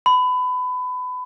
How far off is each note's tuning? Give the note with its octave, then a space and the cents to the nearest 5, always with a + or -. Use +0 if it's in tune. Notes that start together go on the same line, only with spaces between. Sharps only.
B5 +25